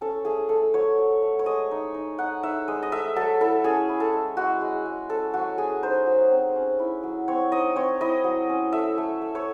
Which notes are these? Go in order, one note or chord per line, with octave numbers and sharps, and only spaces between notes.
C#4 A4
A3 G#4
A3 A4
F#3 C#5
F#3
A3
C#5
G#3 D#5
D#4
D#4
D#4 F#5
D#4 E5
G#3 D#5
D#5
A3 E5
F#3 A4
E4 A4
C#4 G#4
E4
A4
G#3
G#3 F#4
G#3
G#3
C#4 A4
F#3 F#4
C#4 G#4
D#4 C5
F#3
C4
C#4
E4
F#3
C4 C#5
D#4 D#5
C4 C#5
E4 D#5
F#3
C#4
A3 E5
A3
A3
C#5